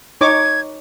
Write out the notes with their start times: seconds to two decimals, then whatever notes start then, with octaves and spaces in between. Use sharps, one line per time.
0.21 D#4 C#5 D6 G#6